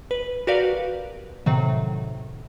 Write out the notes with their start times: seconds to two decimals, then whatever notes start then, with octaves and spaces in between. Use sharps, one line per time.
0.11 B4
0.47 F#4 G4 A#4 B4 D5 F5
1.46 A2 C3 D#3 F#3